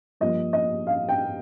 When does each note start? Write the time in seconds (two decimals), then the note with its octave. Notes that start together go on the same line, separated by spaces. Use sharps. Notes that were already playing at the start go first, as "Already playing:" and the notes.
0.20 G2 F3 A#3 D#5
0.53 D#5
0.87 F5
1.09 G5